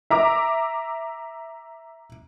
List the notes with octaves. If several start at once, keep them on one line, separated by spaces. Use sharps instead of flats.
E5 A#5 D6